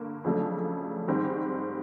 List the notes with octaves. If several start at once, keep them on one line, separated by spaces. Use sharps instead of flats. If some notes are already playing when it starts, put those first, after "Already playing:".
Already playing: G2 D3 A#3
F2 C#3 F#3 A3 D4
G#2 D#3 G3 C4